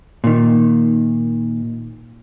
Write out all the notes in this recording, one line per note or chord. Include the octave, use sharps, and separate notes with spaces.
A#2 D#3